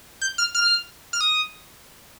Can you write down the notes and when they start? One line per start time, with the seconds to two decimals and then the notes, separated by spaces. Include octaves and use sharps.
0.21 G6
0.38 F6
0.55 F6
1.13 F6
1.21 D#6